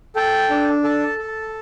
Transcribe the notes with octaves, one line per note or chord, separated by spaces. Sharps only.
A4 G5
D4
A4 A5
A4